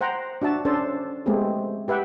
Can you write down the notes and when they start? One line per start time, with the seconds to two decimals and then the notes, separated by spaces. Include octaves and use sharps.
0.01 C5 F#5 G5 A#5
0.42 D4 F#4 E5 A5
0.65 C#4 D4 A4 C5 A5
1.26 G#3 A3 B3 C4 G4 G#4
1.88 G4 B4 E5 F#5 G5